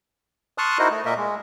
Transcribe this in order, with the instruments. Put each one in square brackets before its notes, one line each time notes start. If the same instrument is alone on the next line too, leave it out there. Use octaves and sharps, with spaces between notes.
[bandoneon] A5 C6 C#6 D#6 F6 F#6
D#4 E4 F#4 A#4 C5 D#5
A3
A#2 A#3 A#4 D#5 E5
G#3